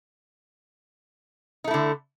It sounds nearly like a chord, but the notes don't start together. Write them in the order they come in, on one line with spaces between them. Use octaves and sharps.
D#4 A3 E4 D3